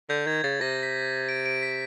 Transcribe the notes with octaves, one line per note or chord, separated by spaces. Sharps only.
D3 G6
D#3 G#6
C#3 A6
C3 A#6
B6
D7
D7
B6